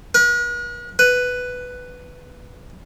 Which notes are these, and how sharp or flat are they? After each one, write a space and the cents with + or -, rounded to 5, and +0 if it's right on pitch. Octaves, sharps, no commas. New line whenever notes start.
B4 -45
B4 +5